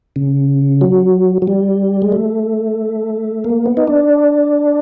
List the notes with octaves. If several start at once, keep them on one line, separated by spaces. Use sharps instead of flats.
C#3
F#3
F#3
G3
G#3
A3
A#3
B3
D#4
D4